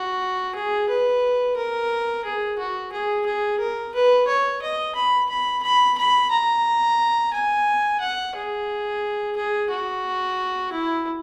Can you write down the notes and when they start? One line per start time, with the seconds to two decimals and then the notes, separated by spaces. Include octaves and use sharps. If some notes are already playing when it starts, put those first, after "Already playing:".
Already playing: F#4
0.55 G#4
0.89 B4
1.56 A#4
2.24 G#4
2.58 F#4
2.92 G#4
3.26 G#4
3.59 A#4
3.94 B4
4.27 C#5
4.62 D#5
4.95 B5
5.29 B5
5.63 B5
5.98 B5
6.31 A#5
7.33 G#5
8.00 F#5
8.35 G#4
9.36 G#4
9.69 F#4
10.72 E4